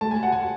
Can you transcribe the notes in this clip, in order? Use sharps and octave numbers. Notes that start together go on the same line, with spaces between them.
A3 A5
G#5
F#5
G#5